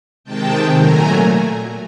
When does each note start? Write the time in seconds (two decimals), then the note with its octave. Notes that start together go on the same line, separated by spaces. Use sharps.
0.24 C3 D#3 G#3 G5 A5
0.74 A#2 F#3 A3 G#5 A#5